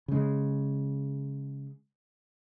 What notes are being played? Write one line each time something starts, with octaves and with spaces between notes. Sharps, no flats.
C#3 G#3